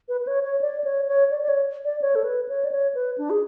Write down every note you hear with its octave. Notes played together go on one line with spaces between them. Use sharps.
B4
B4
C#5
C#5
D5
C#5
C#5
D5
D5
C#5
D5
C#5
A4
B4
C#5
D5
C#5
B4
D4
G#4